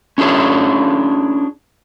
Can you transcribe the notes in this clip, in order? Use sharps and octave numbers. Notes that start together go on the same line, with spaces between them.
C#4 D4 E4 G#4 C#5